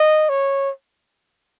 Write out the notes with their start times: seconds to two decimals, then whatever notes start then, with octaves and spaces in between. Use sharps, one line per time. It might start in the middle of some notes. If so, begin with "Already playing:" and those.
Already playing: D#5
0.29 C#5